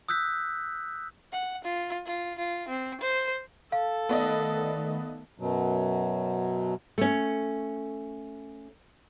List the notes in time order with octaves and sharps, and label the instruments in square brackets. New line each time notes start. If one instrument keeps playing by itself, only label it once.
[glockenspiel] D#6 E6 F#6 G6 B6
[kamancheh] F#5
F4
F4
F4
C4
C5
[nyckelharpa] A4 [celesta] F5
[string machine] D#3 A3 [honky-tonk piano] B3 D5 D#5
[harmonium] F#2 B2 F#3
[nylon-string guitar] A3 C#4